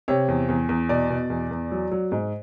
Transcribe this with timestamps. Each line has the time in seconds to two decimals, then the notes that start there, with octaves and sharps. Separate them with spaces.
0.08 C3 C#5
0.28 E2
0.49 E2
0.69 E2
0.89 B2 D5
1.10 B2
1.30 E2
1.51 E2
1.71 F#3
1.91 F#3
2.12 G#2